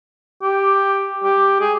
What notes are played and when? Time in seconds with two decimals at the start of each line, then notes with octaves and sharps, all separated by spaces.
0.42 G4
1.24 G4
1.60 G#4